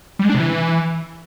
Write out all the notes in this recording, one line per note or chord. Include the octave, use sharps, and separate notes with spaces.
G3
G#3
D4
C3
E3